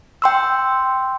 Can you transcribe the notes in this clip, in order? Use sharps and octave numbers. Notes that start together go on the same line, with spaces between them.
G5 C6 E6